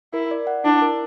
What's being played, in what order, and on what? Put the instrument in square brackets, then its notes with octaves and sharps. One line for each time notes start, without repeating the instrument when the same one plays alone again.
[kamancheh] E4 [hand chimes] A#4
[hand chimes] D5
F#5
[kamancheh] D4 [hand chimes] E4
[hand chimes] A#4